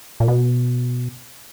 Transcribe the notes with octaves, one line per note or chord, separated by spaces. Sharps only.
A#2
B2